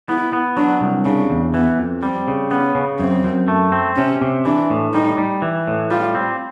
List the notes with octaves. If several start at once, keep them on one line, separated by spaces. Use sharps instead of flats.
B3 E4
B3
F#3 D4
C2
C#3 D4
E2
E3 B3
F2
G3 C4
C#3
B3 C#4
C#3
F#2 C4
F#2
A3
C4
C3 C#4
C3
E3 D4
A2
G3 D#4
G3
E3
A2
G3 F4
C4